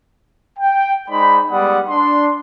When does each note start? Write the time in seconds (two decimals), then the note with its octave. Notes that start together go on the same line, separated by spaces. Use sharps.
0.59 G5
1.09 G#3 D#4 C5 D5 B5
1.50 G3 G#3 B3 D5 F#5 D#6
1.89 D4 C6